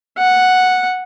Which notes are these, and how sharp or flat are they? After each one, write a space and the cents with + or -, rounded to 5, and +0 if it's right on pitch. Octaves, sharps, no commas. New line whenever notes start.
F#5 -5